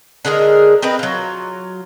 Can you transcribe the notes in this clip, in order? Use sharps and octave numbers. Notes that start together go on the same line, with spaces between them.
D3 G#3 G#4 A#4
C4 A#4 B4 D#5
F#3 F4